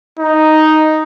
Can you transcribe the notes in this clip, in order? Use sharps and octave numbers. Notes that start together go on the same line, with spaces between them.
D#4